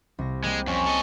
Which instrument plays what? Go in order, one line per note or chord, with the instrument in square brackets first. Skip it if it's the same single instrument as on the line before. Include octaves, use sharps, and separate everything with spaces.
[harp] C2 A#6
[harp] G3 A#3 [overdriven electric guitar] G#3
[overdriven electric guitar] F2 [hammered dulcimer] C#4
[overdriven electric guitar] A4 D#5